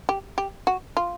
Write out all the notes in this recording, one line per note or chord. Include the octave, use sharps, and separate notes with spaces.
G4
G4
F#4
F4